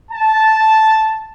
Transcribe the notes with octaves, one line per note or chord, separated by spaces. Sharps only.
A5